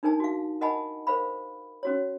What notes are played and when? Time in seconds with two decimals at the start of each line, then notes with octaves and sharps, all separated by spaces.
0.03 D4 D#4 A#4 G#5 A5
0.20 F#4 F5
0.61 A#4 D#5 F#5 G#5 A5 B5
1.07 A#4 C5 F5 B5
1.83 C#4 F#4 C#5